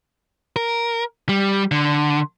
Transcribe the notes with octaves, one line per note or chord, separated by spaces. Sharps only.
A#4
G3
D3